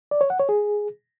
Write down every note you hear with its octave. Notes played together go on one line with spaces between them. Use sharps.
D5
C#5
F#5
C#5
G#4